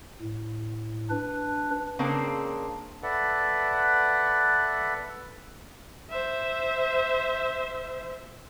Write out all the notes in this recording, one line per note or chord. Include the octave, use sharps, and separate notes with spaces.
A2
D4 B4
C#3 A#3 C4 D4
A4 B4 D5 E5 F#5
C5 E5